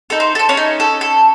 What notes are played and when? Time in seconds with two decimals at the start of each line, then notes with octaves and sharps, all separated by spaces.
0.10 D#4 A4
0.20 C5
0.35 A4 C5
0.49 C#4 C#5
0.57 D#4
0.80 A4
1.01 A4